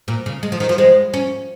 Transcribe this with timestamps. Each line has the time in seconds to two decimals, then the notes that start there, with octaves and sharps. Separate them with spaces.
0.08 A#2
0.26 C#3
0.43 G#3
0.52 F3
0.60 D#3
0.69 F3
0.78 G#3
1.14 C#4